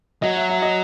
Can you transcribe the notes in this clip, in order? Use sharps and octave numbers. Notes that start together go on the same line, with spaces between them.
F#3 D#5
E5
E5
D#5